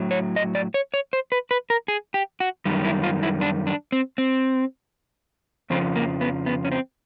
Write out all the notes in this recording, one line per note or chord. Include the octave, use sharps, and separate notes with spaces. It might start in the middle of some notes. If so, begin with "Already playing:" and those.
Already playing: A2 F#3
C#5
D#5
D5
C#5
C#5
C5
B4
B4
A#4
G#4
G4
F#4
F#2 D#3 G3
E4
F4
E4
D4
D4
C4
C4
F2 C#3 F3 C4
A#3
B3
B3
C#4
C4